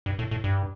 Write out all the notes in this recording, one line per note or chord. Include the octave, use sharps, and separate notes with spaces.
G2
A2
A2
G2